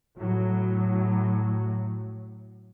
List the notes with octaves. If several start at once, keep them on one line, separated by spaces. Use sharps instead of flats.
A2 F#3